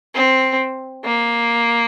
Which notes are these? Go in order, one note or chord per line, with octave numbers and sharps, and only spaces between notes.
C4
A#3